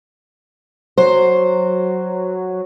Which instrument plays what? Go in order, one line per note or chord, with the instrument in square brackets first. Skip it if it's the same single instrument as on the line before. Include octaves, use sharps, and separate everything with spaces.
[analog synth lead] F#3 [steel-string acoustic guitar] C5